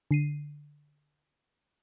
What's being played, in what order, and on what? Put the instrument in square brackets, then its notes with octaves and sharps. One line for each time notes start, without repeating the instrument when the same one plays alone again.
[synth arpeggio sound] D3 C7 D#7